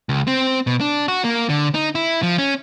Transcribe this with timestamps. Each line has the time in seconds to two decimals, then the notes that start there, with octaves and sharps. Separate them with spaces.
0.09 C#2
0.27 C4
0.67 B2
0.81 D4
1.08 F#4
1.24 A#3
1.49 D3
1.74 D#4
1.95 E4
2.23 F3
2.38 C#4